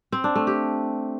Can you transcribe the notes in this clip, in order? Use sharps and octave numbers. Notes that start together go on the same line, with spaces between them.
C4
D4
A3
G4